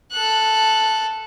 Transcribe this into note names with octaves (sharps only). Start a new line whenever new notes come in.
A4 F#6